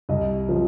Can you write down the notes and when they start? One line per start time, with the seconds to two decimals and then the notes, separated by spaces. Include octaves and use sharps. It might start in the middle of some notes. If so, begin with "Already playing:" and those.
0.09 C2 D#5
0.49 C3 F3